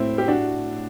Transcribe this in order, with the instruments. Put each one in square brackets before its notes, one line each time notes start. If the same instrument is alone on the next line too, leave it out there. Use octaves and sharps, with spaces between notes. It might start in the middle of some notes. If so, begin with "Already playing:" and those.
Already playing: [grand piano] A2 [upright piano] A3 C4 E4
[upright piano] G4
D4 F#4